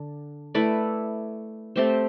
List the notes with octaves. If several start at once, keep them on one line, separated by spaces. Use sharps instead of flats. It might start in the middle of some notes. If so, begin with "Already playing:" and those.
Already playing: D3 D4
A3 E4 B4 D5
A3 C4 G4 C5